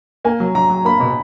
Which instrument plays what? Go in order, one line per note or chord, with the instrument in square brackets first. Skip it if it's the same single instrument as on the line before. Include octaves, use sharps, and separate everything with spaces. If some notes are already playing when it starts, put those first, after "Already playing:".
[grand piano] A#3 [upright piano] G#5
[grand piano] F#3
[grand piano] F#3 [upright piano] A#5
[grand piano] F#3
[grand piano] A#3 [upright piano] B5
[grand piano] B2